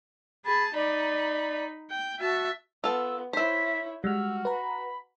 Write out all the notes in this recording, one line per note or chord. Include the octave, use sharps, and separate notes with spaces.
G#4 A5 B5
D#4 D5 B5
G5
F#4 E5 A5
B3 F4 A4 E6
E4 C5 C#5 E5 B6
G3 G#3 F#4 E6 F6
B4 A#5 B5